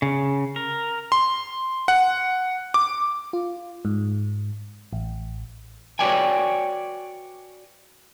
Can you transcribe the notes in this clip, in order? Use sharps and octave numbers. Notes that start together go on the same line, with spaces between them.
C#3
A#4
C6
F#5
D6
F4
G#2
A1
F#4 B4 C#5 D5 G5 G#5